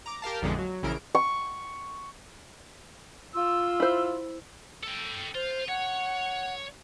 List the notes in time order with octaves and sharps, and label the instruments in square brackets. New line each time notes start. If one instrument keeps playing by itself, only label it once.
[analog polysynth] A#5 D6
G4 A#4 F5 A5
A1 F2 A#2 D3 F3 G#3
F#3
A#1 C#3 E3 A#4 D7
[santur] C#6
[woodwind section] F4 E6
[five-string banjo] E4 C5
[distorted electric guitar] A4 G5
[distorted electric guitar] F4 [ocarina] C5
[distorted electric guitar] C#5 [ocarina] F#5